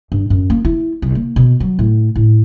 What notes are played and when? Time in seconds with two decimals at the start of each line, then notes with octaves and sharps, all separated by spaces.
0.12 G2
0.30 F#2
0.50 A#3
0.65 E4
1.02 C2
1.15 A#3
1.36 B2
1.60 F#3
1.79 A2
2.16 A2